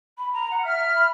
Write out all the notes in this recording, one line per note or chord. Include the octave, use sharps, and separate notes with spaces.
B5
A#5
F#5
E5 F6
B5